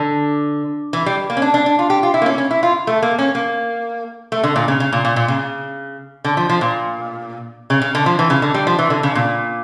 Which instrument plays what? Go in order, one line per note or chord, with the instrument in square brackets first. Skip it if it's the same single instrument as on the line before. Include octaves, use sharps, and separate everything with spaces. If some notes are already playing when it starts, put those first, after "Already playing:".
Already playing: [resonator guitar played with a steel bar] D3
E3
G3
A#3
C#4
D4
D4
D4
F4
G4
F4
E4
A#3
C#4
C#4
E4
F4
A3
A#3
C#4
A#3
A3
D3
A#2
C#3
C#3
A#2
A#2
A#2
C#3
D3
F3
F3
A#2
C#3
C#3
D3
F3
E3
C#3
D3
G3
F3
E3
D3
C#3
A#2